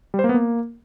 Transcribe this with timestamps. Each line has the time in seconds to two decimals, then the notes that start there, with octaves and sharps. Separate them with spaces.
0.14 G3
0.19 C5
0.24 A#3
0.29 B3
0.34 A#3